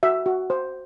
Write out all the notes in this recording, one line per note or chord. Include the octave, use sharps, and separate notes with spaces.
F#4 E5
F#4
C5